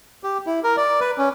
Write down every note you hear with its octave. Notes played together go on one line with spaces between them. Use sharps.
G4
E4
A#4
D5
B4
C#4